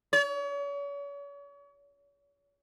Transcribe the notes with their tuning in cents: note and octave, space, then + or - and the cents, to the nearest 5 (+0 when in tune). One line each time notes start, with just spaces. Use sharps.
C#5 +40